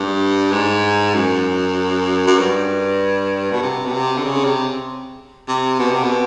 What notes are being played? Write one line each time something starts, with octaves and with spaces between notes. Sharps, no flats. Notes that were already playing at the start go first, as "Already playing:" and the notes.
Already playing: G2
G#2
F#2
F#2
G2
B2
C3
B2
C3
D3
C#3
C3
C3
B2
C3
B2